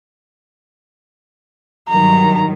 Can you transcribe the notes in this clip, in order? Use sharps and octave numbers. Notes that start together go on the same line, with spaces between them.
G2 D#3 F#3 A#5